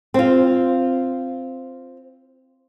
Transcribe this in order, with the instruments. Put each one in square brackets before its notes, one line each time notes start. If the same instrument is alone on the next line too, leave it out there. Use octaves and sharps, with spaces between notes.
[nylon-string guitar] C4 F4